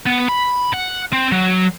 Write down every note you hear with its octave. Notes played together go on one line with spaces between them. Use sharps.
B3
B5
F#5
C4
F#3